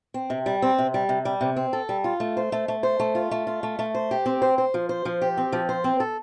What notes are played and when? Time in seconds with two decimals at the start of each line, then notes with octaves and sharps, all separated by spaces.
0.14 C4
0.30 C3
0.46 G3
0.62 C4
0.78 C3
0.94 G3
1.09 C3
1.25 G3
1.41 C3
1.56 C4
1.73 A4
1.89 G3
2.04 F4
2.20 A3
2.37 C5
2.52 A3
2.68 A3
2.83 C5
3.00 A3
3.15 F4
3.31 A3
3.47 F4
3.63 A3
3.79 A3
3.95 C5
4.11 G4
4.26 C4
4.42 C5
4.58 C5
4.74 F3
4.89 C5
5.05 F3
5.22 G4
5.38 C4
5.53 F3
5.69 C5
5.84 C4
6.00 A4